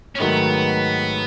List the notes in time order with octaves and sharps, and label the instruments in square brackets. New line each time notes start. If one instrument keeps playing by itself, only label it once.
[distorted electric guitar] C#4
[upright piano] G#2 D#3 F#3 A3 [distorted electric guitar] B3